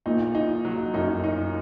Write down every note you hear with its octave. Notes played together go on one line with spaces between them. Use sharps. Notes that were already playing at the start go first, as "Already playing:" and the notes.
A#1 A#2 D#4
D#4
F#3
F#2 D#4
D#4